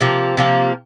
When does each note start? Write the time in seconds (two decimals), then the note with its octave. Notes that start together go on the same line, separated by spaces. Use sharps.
0.01 C3 F3 A#3
0.37 C3 F3 A#3